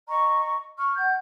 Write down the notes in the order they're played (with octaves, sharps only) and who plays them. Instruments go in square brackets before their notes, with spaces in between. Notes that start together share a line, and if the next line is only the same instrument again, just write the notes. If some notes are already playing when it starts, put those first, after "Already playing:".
[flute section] D#5 A#5 C#6
C#6 F6
F#5 G6